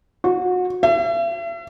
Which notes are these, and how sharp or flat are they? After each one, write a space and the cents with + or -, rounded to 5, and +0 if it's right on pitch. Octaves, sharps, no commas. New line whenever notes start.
F#4 -30
E5 +40